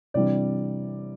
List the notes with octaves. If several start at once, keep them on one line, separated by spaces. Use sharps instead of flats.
C3 E3 G3 D4 D5